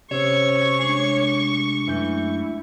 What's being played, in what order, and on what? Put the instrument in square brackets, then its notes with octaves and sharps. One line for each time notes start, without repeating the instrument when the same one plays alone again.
[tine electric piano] C3 [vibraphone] C#4 C5 E6 [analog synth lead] C#5 [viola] C#6
[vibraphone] G#3 D4
[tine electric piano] F#2 A3 G6 [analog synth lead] E3